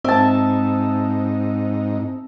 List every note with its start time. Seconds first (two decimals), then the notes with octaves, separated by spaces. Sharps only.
0.05 G#2 C4 D#4 E5 A5